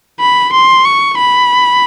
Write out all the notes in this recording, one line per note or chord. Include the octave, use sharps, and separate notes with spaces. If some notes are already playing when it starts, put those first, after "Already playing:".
B5
C6
C#6
B5